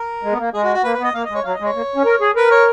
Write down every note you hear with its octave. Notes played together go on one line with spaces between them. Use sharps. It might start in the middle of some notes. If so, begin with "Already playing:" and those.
Already playing: A#4
G#3
B3
A#3
G#3 G#4
F#4
F#4
A#3 B4
B4
B3
D#5
A#3 F5
D#5
G#3
C#5
F#3 F5
D#5
G#3 C#5
A#3
C#4
A#4
G#4
A#4 B4
C#5